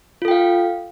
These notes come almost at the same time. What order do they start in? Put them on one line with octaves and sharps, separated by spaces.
F4 A4 G5 F5